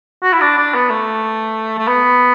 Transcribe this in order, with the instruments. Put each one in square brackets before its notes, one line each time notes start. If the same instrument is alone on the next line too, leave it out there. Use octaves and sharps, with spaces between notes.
[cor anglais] F#4
E4
D4
D4
B3
A3
A3
B3